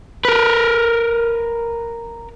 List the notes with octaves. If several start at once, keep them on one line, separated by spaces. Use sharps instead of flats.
A#4 B4